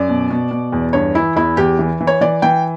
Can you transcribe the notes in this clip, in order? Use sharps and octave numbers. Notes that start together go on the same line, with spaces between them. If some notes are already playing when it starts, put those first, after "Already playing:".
Already playing: F#2 D5
B2
B2
B2
E2
G2 C#5
E3 E4
E2 E4
E2 G4
E3
E3
C#5
E3 D5
E3 G5